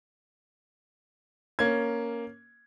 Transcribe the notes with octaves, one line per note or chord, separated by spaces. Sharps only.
A#3 C#4 G#6